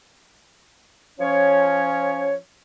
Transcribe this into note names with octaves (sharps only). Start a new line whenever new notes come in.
F3 C#4 C#5